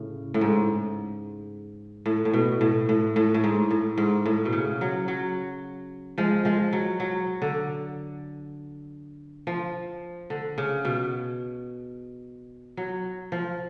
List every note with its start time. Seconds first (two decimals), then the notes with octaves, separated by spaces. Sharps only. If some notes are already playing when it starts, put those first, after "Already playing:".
Already playing: A2 C#3
0.34 A2
0.41 G#2
2.06 A2
2.25 A2
2.34 B2
2.61 A2
2.89 A2
3.16 A2
3.34 A2
3.44 G#2
3.71 A2
3.98 G#2
4.26 A2
4.45 B2
4.53 C#3
4.81 F#3
5.08 F#3
6.18 F3 G#3
6.45 F3 G#3
6.73 F#3
7.00 F#3
7.42 D3
9.47 F3
10.30 D3
10.58 C#3
10.85 B2
12.77 F#3
13.32 F3